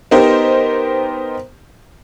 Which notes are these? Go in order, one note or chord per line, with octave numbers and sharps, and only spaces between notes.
B3 D#4 G4 A#4 C5